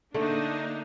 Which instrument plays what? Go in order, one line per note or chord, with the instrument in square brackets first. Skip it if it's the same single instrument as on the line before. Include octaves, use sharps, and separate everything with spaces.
[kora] D3 A3 [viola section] A#3 D4 D#4